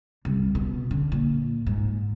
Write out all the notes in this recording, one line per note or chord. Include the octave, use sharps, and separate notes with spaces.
C2
B2
D3
A#2
G#2